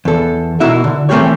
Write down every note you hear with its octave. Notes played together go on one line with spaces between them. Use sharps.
E2 A4
B2 A#3 E4 F#4 E5
D3
E3 A3 A#3 C4 G4 C#5